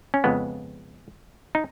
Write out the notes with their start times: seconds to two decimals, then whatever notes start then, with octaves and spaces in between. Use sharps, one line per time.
0.14 C#4
0.24 F2 C#3 F3 G#3 B3
1.55 D#4